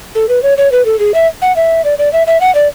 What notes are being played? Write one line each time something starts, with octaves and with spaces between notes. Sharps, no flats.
A4
B4
C#5
C#5
B4
A4
G#4
E5
F#5
E5
D5
D5
E5
E5
F#5
D5